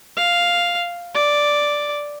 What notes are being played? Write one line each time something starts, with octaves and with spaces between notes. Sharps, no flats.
F5
D5